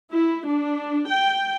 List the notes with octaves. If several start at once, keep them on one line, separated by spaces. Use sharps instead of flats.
E4
D4
G5